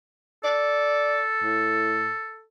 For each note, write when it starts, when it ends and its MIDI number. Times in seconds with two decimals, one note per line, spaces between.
0.44 2.45 69
0.44 1.21 74
1.44 2.14 45